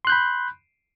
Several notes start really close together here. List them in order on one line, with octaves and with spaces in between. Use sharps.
C6 F#6 G6 B5